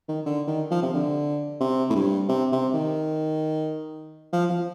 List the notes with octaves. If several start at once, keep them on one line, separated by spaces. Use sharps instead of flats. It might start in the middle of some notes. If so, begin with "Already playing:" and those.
D#3
D3
D#3
F3
C3
D3
C3
A2
G2
C3
C3
D#3
F3
F3